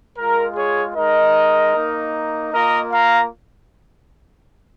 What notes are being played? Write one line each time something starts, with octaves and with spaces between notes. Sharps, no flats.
G#3 F4 A#4
G#4 C#5
G#3 D#4 A#4 D#5
A#3 D#4
A#3 F4 A#4 D#5
F5 A#5